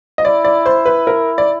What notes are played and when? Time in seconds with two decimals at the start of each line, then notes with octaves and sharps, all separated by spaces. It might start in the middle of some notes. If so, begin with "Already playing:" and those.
0.18 D#5
0.24 E4 D5
0.45 D5
0.66 C5
0.86 B4
1.07 A#4
1.38 D5